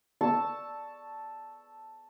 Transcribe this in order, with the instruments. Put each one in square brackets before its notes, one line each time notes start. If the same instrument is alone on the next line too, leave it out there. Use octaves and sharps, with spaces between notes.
[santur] A5 C#6 E6